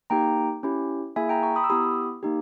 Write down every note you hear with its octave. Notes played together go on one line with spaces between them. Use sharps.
A#3 D#4 G4 G5 A#5
C#4 E4 G4
A#3 E4 G#4 E5 G#5
G5 A#5
A#5 C#6
B5 D#6
E6
B3 E4 G4 B5 D#6
A#3 D#4 G4